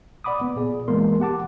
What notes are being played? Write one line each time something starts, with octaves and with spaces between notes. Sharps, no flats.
D5 F#5 B5 D6 D#6
B3
A#2 G#4 D5
E3 G#3 A#3 B3 A#4 C6
G4 F#5 A5 D6